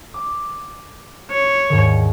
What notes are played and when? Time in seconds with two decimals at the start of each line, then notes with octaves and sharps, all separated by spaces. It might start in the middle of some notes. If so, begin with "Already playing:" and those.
0.14 D6
1.30 C#5
1.69 D#2 G#2 D#3